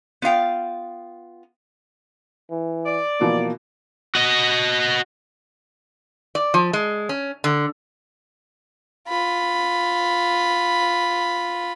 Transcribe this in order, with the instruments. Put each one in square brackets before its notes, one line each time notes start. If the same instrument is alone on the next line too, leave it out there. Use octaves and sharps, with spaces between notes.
[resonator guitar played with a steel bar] B3 F4 F5 G5
[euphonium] E3
[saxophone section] D5
[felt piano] B2 E3 F3 [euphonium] A#3
[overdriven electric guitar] F#4 D#5
[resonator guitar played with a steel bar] D5
F3
G#3
C#4
D3
[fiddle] F4 B5